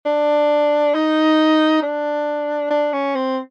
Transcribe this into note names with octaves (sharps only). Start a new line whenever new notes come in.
D4
D#4
D4
D4
C#4
C4